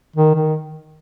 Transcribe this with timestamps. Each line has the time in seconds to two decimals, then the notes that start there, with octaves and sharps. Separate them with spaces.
0.16 D#3
0.35 D#3